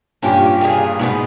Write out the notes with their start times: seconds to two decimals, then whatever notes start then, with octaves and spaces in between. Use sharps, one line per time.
0.22 G2 A#2 A#3 C#4 G4
0.61 A#2 A#3 D#4 G#4
0.99 G#2 B2 G#3 B3 D#4